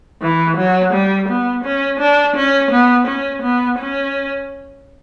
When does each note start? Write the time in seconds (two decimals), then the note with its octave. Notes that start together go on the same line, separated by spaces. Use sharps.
0.22 E3
0.57 F#3
0.93 G3
1.28 B3
1.64 C#4
2.00 D4
2.36 C#4
2.71 B3
3.07 C#4
3.42 B3
3.79 C#4